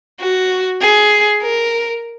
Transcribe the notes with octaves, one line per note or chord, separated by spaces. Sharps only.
F#4
G#4
A#4